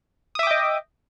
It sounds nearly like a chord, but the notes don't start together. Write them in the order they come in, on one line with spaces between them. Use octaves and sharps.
D#6 E5 D6 G5 D#5